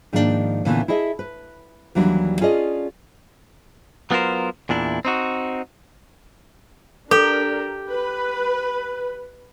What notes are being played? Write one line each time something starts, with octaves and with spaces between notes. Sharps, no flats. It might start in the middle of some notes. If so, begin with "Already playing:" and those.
G#2 D#3 F3 A#3 B3 D4
A#2 D3 E3 A3 B3 C#4
E4 G#4 A4 D#5 E5
B4
D#2 E3 F#3 G3 D4
C#4 F4 G#4 A4 D5 D#5
F#3 B3 F4 G#4 A#4 C5
E2 A#2 D4 E4
C4 D#4 F#4
D4 G4 A4 A#4
B4